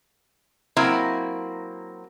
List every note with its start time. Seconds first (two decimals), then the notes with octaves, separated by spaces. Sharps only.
0.76 F#3 A#3 C4 E4